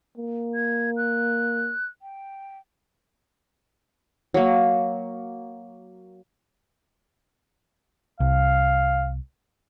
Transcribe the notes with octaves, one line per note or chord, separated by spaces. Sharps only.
A#3
G#6
F#6
G5
F#3 A#3
C2 F5